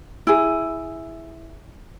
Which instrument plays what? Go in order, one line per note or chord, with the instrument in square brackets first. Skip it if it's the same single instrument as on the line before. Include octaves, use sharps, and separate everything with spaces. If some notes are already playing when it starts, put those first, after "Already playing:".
[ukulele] E4 G#4